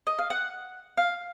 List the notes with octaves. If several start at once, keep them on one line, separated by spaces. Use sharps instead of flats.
D#5
F5
F#5
F5